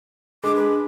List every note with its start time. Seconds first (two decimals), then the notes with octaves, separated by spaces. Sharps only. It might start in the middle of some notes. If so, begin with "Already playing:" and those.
0.44 G#3 D4 D6
0.56 B4